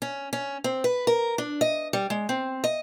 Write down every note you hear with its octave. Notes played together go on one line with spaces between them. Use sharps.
C#4
C#4
C4
B4
A#4
D4
D#5
G3
G#3
C4
D#5